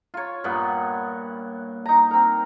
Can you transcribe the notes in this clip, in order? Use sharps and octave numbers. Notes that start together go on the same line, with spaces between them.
F4 C#5
G2 A#2 B3 F#5
D#4 A#5
C4 A#4